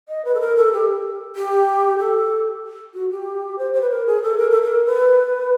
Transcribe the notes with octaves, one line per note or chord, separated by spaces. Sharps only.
D#5
B4
A4
A#4
A4
G4
G4
A4
F#4
G4
C5
C5
B4
A#4
G#4
A4
A#4
A4
A#4
B4